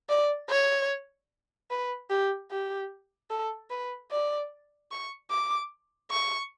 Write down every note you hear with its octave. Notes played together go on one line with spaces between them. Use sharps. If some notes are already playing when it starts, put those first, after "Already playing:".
D5
C#5
B4
G4
G4
A4
B4
D5
C#6
D6
C#6